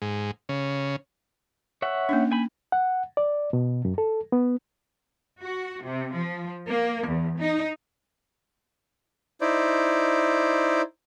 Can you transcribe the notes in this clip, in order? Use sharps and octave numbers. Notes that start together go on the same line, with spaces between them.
G#2
C#3
C#5 E5 F#5
A#3 C#4 D4
A#3 G#5 B5
F#5
D5
B2
F#2
A4
B3
F#4
C3
F3
A#3
E2
D#4
D#4 E4 C5 D5